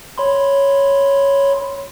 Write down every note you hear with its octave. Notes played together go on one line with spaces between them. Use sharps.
C#5 B5 C6